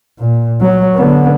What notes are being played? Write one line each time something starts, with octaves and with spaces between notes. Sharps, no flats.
A#2
F#3
D3 B3